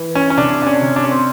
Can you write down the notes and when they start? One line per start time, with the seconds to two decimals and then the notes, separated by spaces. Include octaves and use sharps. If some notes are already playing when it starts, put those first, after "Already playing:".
Already playing: E3
0.15 C#4
0.30 C#4
0.37 C3 D4
0.62 D4
0.67 C#4
0.81 C3
0.96 D4
1.04 C#4
1.12 C4